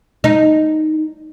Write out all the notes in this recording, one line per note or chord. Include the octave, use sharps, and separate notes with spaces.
D#4